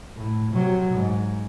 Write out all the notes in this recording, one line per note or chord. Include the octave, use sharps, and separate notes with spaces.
A2
C3 F#3
G#2